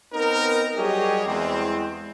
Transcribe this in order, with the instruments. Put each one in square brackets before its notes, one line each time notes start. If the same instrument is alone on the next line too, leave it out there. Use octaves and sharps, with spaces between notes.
[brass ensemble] B3 C4 D#4 A#4
F#3 G3 G4 G#4 C#5 D#5
E2 G#3 C4